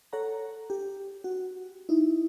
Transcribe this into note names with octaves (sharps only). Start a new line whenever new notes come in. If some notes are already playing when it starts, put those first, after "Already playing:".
A4 C#5 F#5 A#5
G4
F#4
D#4 E4